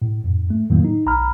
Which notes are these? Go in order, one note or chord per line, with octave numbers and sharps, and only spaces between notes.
A2
F2 G#2
A3
F2 A2 D#3 F#3 A#3
D#4
B1 A#5 B5 F6